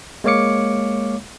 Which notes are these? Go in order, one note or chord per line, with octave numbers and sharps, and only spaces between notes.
G#3 A#3 C#5 F5 D6 C#7